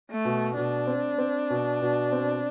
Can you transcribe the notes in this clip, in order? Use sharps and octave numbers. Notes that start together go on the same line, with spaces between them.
A3
B2
B2 D4
C4
C4
B2
B2
C4